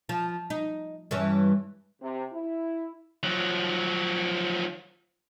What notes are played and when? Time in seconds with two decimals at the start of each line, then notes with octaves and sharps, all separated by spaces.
0.09 F3
0.50 D#4
1.11 G2 E3 C#4
2.02 C3
2.33 E4
3.23 F3 F#3